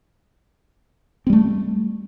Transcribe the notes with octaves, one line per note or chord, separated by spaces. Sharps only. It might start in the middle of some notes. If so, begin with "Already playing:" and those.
G3 A3 C4